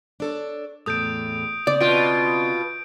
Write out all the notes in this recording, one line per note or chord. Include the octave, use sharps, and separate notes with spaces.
D4 A4 C#5
E2 A2 A4 D#6 G6 D7
C#3 C4 D5
B2 F4 G6 D7